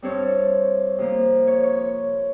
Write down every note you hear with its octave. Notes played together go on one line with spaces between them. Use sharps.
G2 G3 C4 C#5
C3 F3 A#3
C#5
C#5